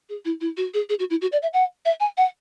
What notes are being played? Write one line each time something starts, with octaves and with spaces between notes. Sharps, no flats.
G#4
E4
E4
F#4
G#4
G#4
F#4
E4
F#4
D5
E5
F#5
E5
G#5
F#5